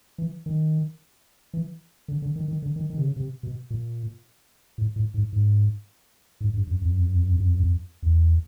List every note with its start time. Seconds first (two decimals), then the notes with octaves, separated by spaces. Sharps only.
0.18 E3
0.46 D#3
1.54 E3
2.08 D3
2.22 D3
2.36 D#3
2.48 D#3
2.62 D3
2.76 D#3
2.90 D#3
2.98 C3
3.03 C#3
3.16 C3
3.43 B2
3.71 A#2
4.78 A2
4.96 A2
5.14 G#2
5.33 G#2
6.41 G#2
6.54 G2
6.67 F#2
6.82 F2
6.89 F#2
6.96 F2
7.05 F#2
7.13 F2
7.21 F#2
7.28 F2
7.36 F#2
7.44 F2
7.53 F#2
7.60 F2
8.03 E2